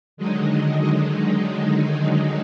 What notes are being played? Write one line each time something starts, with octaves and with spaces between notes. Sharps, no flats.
D3 D#3 F#3 G#3 D#4